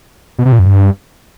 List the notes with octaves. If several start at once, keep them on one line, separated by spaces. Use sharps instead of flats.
B2
C3
A#2
F#2
G2